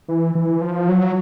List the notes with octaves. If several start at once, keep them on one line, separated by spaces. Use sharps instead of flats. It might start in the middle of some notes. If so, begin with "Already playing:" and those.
E3
E3
F3
F#3